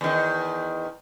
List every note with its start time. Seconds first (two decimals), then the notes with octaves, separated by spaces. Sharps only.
0.01 E2 D#3